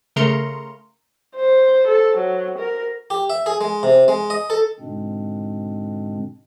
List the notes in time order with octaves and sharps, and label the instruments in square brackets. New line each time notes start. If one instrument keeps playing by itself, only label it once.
[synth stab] C#3 A3 A#4 A#5 C6 C#7
[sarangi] C5
A4
F#3
A#4
[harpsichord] G4
E5
G#4
G#3
C3
G#3
D#5
A4
[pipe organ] G#2 B2 D3 G#3 C4 D4